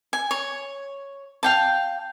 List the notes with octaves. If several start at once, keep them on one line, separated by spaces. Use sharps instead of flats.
G#5
C#5
F5 G5 A5